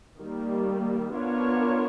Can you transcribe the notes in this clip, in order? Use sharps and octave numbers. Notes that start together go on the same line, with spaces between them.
D#3 G3 A#3
B3 D4 F4 A#4 C#5